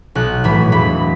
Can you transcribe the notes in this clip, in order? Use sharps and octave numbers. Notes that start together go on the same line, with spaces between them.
B1 F#6
A2 E3 B5
E1 B5